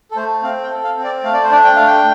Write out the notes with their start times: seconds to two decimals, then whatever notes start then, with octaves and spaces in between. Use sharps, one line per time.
0.11 A4
0.16 A3 C5
0.43 C4 F5
0.64 G5
0.70 A4
0.84 F5
0.97 C4
1.04 D5
1.24 A3 F5
1.34 D5
1.43 C5
1.51 D4 D5
1.64 G5
1.76 A3 F5
1.87 G5